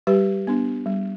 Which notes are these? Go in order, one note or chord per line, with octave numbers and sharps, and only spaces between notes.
G3 G4 B4
B3 D4
G3